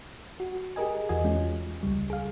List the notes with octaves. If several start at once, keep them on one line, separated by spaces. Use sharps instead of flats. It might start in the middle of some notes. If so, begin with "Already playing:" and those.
F#4
G4 G#4 A#4 D#5 G#5
E2 E3 F#4 D#5 G#5
G#3 C#4 F4
C#2 C#3 G3
G#4 F5